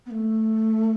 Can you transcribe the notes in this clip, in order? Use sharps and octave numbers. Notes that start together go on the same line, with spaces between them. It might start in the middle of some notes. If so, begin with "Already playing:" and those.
B3
A3